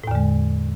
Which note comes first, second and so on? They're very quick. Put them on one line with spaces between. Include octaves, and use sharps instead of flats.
A2 E2 D3 G#3